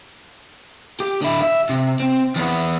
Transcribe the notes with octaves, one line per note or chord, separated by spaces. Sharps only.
G4
D3 E4
E5
C3
C4
E2 B3